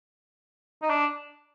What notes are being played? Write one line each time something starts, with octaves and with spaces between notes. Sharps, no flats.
D#4
D4